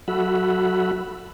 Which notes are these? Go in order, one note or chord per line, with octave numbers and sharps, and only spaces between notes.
F#3 F#4 A4 E5 F#5 B5